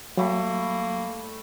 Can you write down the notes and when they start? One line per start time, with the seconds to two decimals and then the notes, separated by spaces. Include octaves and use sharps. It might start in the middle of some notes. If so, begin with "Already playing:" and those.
0.17 F#3 G3 A3 A#3 B5